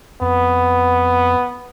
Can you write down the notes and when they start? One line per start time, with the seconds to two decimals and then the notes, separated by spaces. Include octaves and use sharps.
0.21 F2 B3